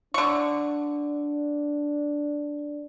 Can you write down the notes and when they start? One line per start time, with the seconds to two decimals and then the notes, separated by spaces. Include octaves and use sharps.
0.14 D3 D4 C#6